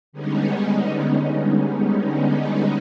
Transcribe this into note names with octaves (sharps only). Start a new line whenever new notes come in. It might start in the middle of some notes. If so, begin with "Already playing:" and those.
D3 G3 G#3 B3 C#4 D#4